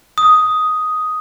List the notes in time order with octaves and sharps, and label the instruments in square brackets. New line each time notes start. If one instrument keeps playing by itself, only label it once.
[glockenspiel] D#6